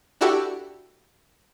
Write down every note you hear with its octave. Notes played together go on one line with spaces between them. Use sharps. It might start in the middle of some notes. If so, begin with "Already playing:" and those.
D4 E4 F#4 G4 A4